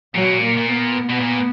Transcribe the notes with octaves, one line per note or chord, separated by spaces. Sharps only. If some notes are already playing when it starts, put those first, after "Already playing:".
A#2 F#3
B2
A#2
A#3
A#2
B3
B2
A#2